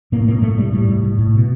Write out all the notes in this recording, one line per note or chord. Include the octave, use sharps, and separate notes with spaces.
A2 A#3
A2 A#3
A2 A3
A2 G3
A2 G3
A2
A2
A2
B2